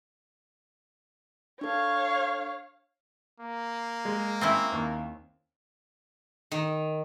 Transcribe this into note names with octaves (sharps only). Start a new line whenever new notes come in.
D4 A4 C#5 F5
A#3
G#3
C4 C#4 E4
D#2
D#3